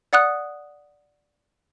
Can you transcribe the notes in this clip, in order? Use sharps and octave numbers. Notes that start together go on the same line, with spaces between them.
D5 F#5 D#6 F#6